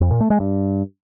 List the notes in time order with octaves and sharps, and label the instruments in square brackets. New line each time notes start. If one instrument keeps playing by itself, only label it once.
[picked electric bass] F2
A#2
A3
G#3
G2